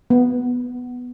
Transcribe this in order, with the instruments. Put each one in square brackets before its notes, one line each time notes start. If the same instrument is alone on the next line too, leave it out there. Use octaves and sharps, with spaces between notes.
[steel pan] B3